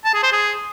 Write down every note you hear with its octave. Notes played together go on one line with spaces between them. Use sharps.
A5
G#4
C5
G#4